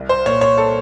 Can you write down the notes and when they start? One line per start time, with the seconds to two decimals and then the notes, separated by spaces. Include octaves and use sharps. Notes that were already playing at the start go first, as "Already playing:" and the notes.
Already playing: C2
0.09 C5
0.26 A#2 C#5
0.41 C#5
0.58 A4